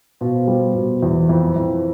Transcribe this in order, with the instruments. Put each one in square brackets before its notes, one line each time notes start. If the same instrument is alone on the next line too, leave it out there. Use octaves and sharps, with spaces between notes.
[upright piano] B2 [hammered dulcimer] F3 F4
[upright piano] G3
B2
E2
[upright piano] F2 [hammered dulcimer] E3 E4
[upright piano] F2